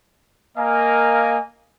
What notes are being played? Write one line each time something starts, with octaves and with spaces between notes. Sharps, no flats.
A#3 A#4 D#5 F5 G#5